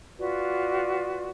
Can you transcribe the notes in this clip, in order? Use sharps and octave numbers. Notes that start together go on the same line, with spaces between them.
F4 F#4 B4 D5